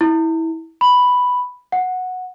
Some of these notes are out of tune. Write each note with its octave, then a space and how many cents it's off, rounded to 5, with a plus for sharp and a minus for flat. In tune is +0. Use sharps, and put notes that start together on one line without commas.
E4 -20
B5 +0
F#5 -10